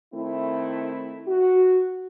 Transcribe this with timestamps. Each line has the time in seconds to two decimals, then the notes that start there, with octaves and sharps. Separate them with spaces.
0.14 D#3 A3 C4 E4
1.27 F#4